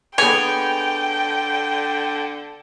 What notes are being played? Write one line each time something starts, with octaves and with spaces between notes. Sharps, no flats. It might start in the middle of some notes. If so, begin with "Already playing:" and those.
D3 B3 G#4 C#5 G5 G#5